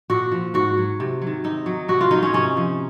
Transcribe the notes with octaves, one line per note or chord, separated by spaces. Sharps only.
A#2 F#4
F3
G#2 F#4
F#3
C3
D#3 F#3
C3 D#4
F#3
C3 F#4
F4
F#3 D#4
C#4
C3 C#4
F3